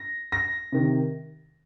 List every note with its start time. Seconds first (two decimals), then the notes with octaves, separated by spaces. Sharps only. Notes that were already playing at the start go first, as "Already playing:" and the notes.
Already playing: A#6
0.32 A#6
0.72 C3 D#3